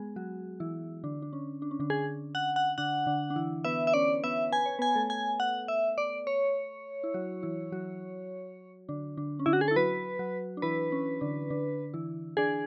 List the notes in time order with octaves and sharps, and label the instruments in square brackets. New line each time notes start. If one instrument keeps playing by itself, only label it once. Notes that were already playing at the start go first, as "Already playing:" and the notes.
Already playing: [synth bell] G#3 B3 G#4
F#3 F#4
E3 E4
D3 D4
D4
C#4
D4
C#4
D3 D4
[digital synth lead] G#4
F#5
F#5
[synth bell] D3 D4 [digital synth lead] F#5
[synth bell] D3 D4
D4
E3 E4
[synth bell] B3 B4 [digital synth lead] E5
[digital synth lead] E5
[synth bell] C#4 C#5 [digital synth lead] D5
[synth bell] B3 B4 [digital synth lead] E5
[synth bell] B4 [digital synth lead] G#5
[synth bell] C#5
[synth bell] B3 B4 [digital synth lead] G#5
[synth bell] A3 A4
[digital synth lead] G#5
F#5
E5
D5
C#5
[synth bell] E4
F#3 F#4
E3 E4
F#3 F#4
D3 D4
D3 D4
C#4
[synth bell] D3 D4 [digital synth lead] E4
[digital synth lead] F#4
G#4
A4
[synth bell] E4
[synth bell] F#3 F#4 [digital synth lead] B4
[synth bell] F#3 F#4
D4
[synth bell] E3 E4 [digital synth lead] B4
[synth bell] C#4
D3 D4
D3 D4
E3 E4
[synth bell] D4 D5 [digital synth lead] G#4